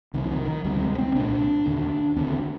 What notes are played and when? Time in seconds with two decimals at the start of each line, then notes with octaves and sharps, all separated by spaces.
0.14 C2 C3 D#3
0.24 F3
0.31 D#3
0.48 D#3
0.64 D2 C3 G3
0.82 G#3
0.98 C4
1.15 C2 A#2 D4
1.66 D#2 D3
2.16 D#2 D3 C4